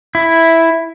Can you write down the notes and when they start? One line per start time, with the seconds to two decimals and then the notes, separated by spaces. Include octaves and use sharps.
0.15 E4